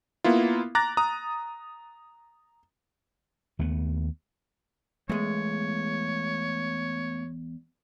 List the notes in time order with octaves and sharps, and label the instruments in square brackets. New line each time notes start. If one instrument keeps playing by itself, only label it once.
[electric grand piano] A#3 B3 E4 F4
A#5 D6 F#6 A6 A#6
A#5 D#6
[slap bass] D#2 A3 B3
[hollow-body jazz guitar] E2 G#3 [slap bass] A3 B3 [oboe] C#5